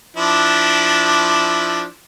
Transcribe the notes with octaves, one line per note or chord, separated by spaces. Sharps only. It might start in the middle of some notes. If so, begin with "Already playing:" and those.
F3 D4 E4